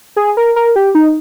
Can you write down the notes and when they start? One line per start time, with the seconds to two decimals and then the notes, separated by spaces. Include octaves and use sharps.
0.16 G#4
0.37 A#4
0.56 A#4
0.76 G4
0.95 D#4